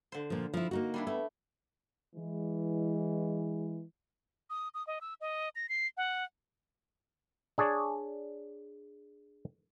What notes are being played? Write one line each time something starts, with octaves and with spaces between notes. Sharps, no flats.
D3 C5
A#2 F3
F3 E4
A#3 D#4 F#4
G3 D4 E4
A3 B3 E4
E3 G#3
D#6
D#6
D#5
E6
D#5
A#6
C7
F#5
D4 G#4 C#5 D5